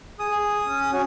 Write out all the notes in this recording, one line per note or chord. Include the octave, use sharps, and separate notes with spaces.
G#4 D#6
G#4
C#4
C#4 F#4